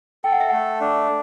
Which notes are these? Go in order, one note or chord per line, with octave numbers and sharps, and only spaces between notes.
A4 G5
F#5
E5
A3 F#5
D4